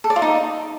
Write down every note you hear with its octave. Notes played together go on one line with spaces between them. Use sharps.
A4
D5
F4
D#4